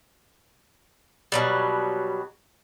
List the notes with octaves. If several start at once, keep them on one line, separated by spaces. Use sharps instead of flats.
B2 F#3 G3